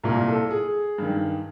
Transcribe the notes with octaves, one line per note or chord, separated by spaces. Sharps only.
C2 A#2 A#4
A4
G#4
G2 D#3